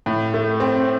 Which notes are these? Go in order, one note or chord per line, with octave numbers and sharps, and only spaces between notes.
A2
A3
C4